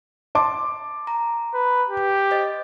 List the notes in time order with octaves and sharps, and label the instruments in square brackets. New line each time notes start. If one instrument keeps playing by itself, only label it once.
[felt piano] A5 C6 D6
[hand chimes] A#5
[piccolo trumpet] B4
G4
[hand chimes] C5 D#5 A6